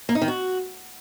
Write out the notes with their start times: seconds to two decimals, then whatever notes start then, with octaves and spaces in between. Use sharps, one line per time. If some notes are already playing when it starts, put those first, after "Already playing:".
0.09 A#3
0.15 D#4
0.22 D#3
0.28 F#4